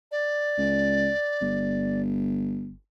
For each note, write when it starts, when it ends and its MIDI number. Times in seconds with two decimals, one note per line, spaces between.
0.12 2.01 74
0.58 1.10 37
1.41 2.74 31